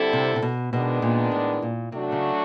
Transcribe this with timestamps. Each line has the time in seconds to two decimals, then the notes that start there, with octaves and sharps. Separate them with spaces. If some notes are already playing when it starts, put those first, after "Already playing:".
Already playing: D3 G3 C4 E4 A4
0.13 C3
0.36 C3
0.42 B2
0.72 B2 D#3 G#3 B3 D4
1.02 A#2
1.32 A2
1.62 A#2
1.92 C3 F#3 A3 D4 F#4
2.12 C#3